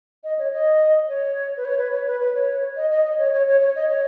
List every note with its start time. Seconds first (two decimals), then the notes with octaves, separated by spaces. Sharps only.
0.24 D#5
0.39 C#5
0.52 D#5
1.09 C#5
1.57 B4
1.65 C#5
1.78 B4
1.92 C#5
2.07 B4
2.21 B4
2.34 C#5
2.76 D#5
2.91 D#5
3.05 D#5
3.18 C#5
3.33 C#5
3.47 C#5
3.61 C#5
3.76 D#5
3.89 C#5